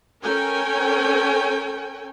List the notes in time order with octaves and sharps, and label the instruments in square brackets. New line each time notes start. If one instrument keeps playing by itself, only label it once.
[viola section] C#4 A4 A#4 G5 G#5